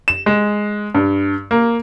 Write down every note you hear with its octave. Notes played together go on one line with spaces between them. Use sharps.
E7
G#3
G2
A#3